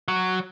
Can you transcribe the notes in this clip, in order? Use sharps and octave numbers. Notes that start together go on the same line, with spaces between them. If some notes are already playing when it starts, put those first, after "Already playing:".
F#3